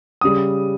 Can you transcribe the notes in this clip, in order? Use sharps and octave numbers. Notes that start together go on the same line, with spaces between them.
C#3 G3 D#6